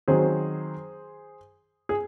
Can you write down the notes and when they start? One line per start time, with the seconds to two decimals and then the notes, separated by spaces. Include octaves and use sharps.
0.08 D#3 F#3 C4 G#4 C5
1.89 G#4